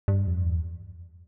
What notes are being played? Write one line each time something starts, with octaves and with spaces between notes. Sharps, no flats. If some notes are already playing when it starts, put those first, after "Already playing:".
G2
F2
E2